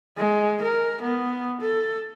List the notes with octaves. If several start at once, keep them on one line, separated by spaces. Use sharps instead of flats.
G#3
A#4
B3
A4